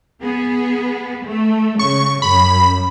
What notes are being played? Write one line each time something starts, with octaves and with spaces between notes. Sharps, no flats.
B3 G#4
A3
C#3 C#6
F#2 B5